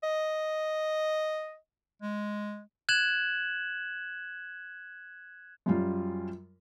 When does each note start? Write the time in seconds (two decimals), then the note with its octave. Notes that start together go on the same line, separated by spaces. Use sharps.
0.03 D#5
2.02 G#3
2.89 F#6 G#6 E7 F#7
5.66 F#2 F#3 G3 F4